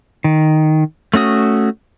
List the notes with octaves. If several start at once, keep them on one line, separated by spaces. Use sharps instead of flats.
D#3
A3 C#4 F#4 D#6